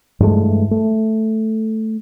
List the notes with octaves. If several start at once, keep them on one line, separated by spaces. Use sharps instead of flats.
G2 E3 G#3 A3
A3